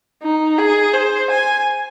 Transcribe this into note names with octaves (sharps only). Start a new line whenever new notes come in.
D#4
G#4
C5
G#5